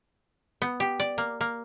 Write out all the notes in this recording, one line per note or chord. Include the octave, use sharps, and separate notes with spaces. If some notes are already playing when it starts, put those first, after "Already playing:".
B3
G4
D5
A#3
A#3